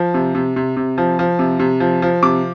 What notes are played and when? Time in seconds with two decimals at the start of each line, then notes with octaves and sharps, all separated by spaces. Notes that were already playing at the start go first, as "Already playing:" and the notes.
Already playing: F3
0.14 C3
0.35 C3
0.56 C3
0.77 C3
0.98 F3
1.19 F3
1.39 C3
1.60 C3
1.80 F3
2.02 F3
2.23 C3 D6